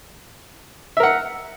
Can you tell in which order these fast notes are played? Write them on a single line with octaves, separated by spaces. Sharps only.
E5 A#4 F#5